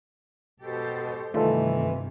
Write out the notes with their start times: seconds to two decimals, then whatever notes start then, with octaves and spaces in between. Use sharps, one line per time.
0.60 B2 G4 A4 C5
1.34 G2 C3 D#3 E3 A3 D#4 F4 A4